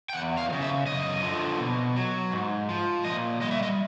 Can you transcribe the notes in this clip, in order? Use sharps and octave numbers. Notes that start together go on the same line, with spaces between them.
G5
E2 F#5
F5
F3
C#3
E5
F#2 D#5
D3 F3
B2
F#3
G#2
F3
A#2 D#5
G3 D#5
E5
D#5